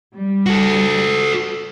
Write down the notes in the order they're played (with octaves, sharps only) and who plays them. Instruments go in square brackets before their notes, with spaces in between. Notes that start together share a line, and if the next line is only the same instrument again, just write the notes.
[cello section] G3
[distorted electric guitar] F#4 A4